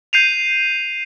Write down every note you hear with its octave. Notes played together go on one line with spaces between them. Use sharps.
G6 C7 D#7 F7